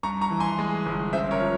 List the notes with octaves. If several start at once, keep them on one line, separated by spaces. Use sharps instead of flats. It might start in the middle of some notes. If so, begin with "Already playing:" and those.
G2 A#5 C#6
A#5 C#6
E3
G#5 C6
G#3
G1
C#3 C5 E5
A#4 C#5
F3